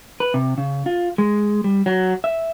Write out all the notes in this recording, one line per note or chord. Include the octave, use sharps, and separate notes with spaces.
B4
C3
C#3
F4
G#3
G3
F#3
E5